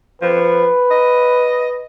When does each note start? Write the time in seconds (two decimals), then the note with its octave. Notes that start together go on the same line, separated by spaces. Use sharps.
0.22 F3 B4
0.91 D#5